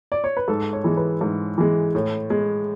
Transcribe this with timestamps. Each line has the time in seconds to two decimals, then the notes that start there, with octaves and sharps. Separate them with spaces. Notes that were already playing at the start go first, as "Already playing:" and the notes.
0.12 D5
0.24 C#5
0.37 B4
0.48 G#2 A4
0.73 C#5
0.84 E3 G#3
0.97 B4
1.21 G#2
1.58 E3 G#3
1.95 A2
2.30 G#3